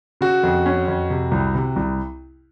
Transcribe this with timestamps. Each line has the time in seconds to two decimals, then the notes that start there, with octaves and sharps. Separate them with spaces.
0.21 C#3 F#4
0.43 F2
0.66 C#4
0.88 F2
1.10 C3
1.31 C2
1.55 C3
1.76 C2